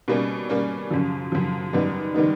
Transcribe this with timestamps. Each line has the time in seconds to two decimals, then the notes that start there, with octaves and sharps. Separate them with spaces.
0.08 B2 G3 A#3 C#4
0.50 B2 G3 A#3 C#4
0.90 F#2 C#3 F3
1.32 F#2 C#3 F3
1.73 F#2 D#3 G3 B3 D#4
2.14 D#3 G3 B3 D#4